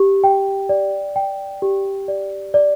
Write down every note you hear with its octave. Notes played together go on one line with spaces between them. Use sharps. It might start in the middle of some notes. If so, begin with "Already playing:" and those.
Already playing: G4
G5
D5
G5
G4
D5
D5